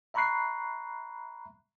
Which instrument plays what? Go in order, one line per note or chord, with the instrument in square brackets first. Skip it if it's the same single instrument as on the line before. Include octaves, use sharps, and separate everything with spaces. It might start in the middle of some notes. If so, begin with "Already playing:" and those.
[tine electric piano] E5 A#5 B5 C#6 F#6 C7